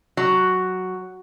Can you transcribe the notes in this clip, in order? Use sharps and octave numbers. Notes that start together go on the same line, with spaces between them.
F#3